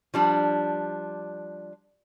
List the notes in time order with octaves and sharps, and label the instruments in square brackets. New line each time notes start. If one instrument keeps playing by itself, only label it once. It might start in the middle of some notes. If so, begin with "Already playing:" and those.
[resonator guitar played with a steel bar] F3 G3 D4